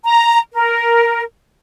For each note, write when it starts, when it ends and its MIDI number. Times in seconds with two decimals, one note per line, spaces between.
0.05 0.39 82
0.53 1.23 70